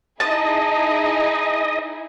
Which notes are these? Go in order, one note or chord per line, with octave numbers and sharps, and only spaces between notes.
D#4 E4 G#4 D#5 A5